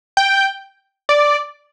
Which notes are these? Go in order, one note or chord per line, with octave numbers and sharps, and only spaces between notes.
G5
D5